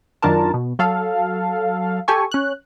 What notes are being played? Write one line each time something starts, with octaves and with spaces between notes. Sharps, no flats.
F#2 D#3 D4 F4 A#4 A5
B2
F#3 A4 F5
G4 A4 G#5 C#6
C#4 F#6